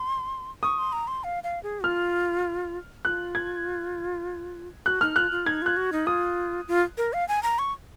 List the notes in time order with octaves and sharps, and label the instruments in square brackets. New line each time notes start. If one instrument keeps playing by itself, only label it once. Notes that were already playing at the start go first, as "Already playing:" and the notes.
Already playing: [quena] C6
[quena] C#6 [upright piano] D#6
[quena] C6
A#5
C6
F5
F5
G#4
[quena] F4 [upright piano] F6
[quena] F4 [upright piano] F#6
[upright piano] G#6
[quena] F#4 [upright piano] F#6
[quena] D#4 [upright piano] F6
[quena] F4 [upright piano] F#6
[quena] F4
[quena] D#4 [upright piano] G#6
[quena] F4 [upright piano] F#6
[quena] F#4
D#4
[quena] F4 [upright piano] D#6
[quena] F4
A#4
F5
G#5
A#5
C#6